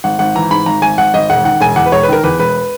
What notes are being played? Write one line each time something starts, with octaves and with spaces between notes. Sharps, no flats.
G#1 F#5
G#1 F#5
E3 A#5
G#2 B5
G#1 A#5
G#1 G#5
G#1 F#5
G#1 D#5
E1 F#5
D#3 F#5
E1 G#5
E2 F#5
B4
E1 C#5
B4
D#3 A#4
E2 B4
E1 B4